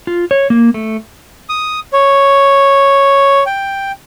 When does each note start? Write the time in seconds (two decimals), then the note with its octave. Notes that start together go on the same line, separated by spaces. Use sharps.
0.07 F4
0.31 C#5
0.50 A#3
0.74 A3
1.49 D#6
1.93 C#5
3.46 G5